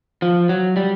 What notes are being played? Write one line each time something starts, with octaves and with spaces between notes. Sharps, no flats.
F3
F#3
G3